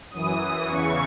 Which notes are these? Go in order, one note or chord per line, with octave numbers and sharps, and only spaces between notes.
F#2 E3 D#6
D#6
E2 C#3 E3 C#6